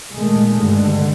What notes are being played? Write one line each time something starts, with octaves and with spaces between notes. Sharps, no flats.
A#2 D#3 G#3 A3
G2 D3